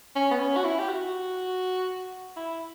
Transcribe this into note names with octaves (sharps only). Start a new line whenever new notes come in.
C#4
B3
C#4
F#4
E4
G4
F#4
E4